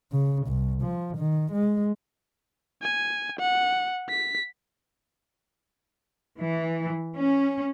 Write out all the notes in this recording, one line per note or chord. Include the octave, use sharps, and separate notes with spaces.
C#3
C2
F3
D#3
G#3
G#5
F#5
B6
E3
C#4